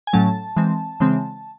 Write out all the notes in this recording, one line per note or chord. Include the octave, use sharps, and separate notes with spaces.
G#5
A2 F#3 A3 C#4 A5
E3 G#3 C4
C#3 E3 G#3 C4